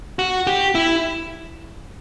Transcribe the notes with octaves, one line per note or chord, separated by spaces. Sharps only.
F#4
G4
E4